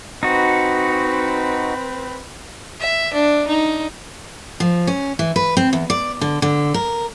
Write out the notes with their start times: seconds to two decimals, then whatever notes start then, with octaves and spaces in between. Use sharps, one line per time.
0.23 C4 D#4 F#4 B4
2.81 E5
3.13 D4
3.47 D#4
4.60 F3
4.87 C#4
5.19 E3
5.36 B4
5.57 C4
5.73 E2
5.90 D5
6.21 D3
6.42 D3
6.74 A#4